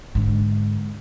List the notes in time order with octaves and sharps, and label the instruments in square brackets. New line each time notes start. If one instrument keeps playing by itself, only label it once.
[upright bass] G#2 D3